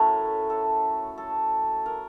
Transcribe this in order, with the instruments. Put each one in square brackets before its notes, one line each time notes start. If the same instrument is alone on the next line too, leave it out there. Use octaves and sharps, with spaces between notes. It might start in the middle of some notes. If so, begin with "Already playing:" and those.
Already playing: [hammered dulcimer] A2 A3 C#4 F#4 A#4
A4
A4
A#4